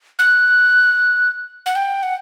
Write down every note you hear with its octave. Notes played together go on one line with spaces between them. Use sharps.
F#6
F#5
G5
F#5